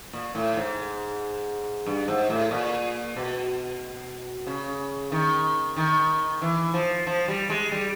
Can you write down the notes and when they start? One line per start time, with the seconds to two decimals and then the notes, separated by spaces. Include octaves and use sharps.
0.13 A#2
0.35 A2
0.56 G#2
1.86 G2
2.08 G#2
2.30 A2
2.51 A#2
3.16 B2
4.47 C#3
5.12 D#3
5.76 D#3
6.42 E3
6.74 F3
7.07 F3
7.28 G3
7.50 G#3
7.72 G3